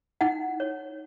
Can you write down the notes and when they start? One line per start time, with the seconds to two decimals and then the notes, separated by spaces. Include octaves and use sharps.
0.21 D#4 F#5
0.60 C#5